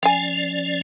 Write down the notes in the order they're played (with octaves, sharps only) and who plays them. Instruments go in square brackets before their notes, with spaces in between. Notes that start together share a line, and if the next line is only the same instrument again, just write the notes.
[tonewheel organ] F3 C#4 D5 [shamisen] G5 G#5